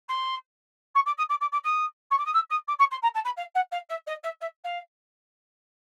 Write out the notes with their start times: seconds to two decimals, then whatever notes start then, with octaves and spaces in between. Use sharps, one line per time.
0.08 C6
0.95 C#6
1.06 D6
1.17 D#6
1.29 D6
1.40 D6
1.52 D6
1.63 D#6
2.10 C#6
2.18 D6
2.25 D#6
2.33 E6
2.50 D#6
2.67 D6
2.79 C#6
2.91 C6
3.02 A#5
3.14 A5
3.24 B5
3.36 F5
3.54 F#5
3.71 F5
3.89 E5
4.06 D#5
4.23 E5
4.41 E5
4.64 F5